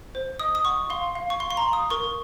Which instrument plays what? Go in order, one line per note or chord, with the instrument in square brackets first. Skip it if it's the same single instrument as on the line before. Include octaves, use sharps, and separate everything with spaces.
[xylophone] C5
D#5 D#6
D#6
F#5 C#6
F5 C6
F5
C#6
F5 C6
C6
A#5
F5
D#6
A#4 C#6